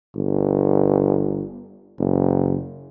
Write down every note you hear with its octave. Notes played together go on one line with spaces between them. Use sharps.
G1
F#1